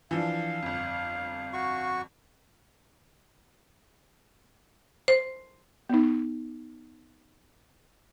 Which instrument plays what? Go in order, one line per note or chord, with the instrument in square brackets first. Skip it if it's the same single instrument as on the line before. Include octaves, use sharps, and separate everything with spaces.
[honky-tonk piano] E3 F3 D4 [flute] F5
[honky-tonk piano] G1 F2
[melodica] F#4 C#6
[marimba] C5
[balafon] B3 D#4